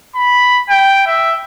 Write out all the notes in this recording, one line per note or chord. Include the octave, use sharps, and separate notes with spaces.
B5
G5
E5